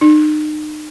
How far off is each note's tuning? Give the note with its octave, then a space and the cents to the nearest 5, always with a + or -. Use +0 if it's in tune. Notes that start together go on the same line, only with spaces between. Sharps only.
D#4 -35